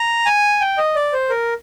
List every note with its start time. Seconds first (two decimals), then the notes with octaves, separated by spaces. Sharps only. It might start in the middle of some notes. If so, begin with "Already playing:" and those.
Already playing: A#5
0.26 G#5
0.61 G5
0.78 D#5
0.95 D5
1.13 C5
1.30 A#4